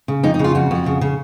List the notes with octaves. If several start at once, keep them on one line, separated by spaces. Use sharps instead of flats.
C#3
F2 D#4
D#4
C#3
F4
F2 F#4
F2
C#3
C#3